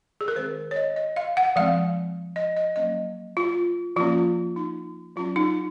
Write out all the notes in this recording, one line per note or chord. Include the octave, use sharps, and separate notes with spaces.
G#4
A#4
D#3 G#3 C4 C5
C#5
D#5
D#5
F5
F#5
F3 G#3 C4 F5
D#5
D#5
F#3 A#3 C#4 D#5
F4
F3 A#3 C#4 F4
D#4
F#3 C#4 F4
D#4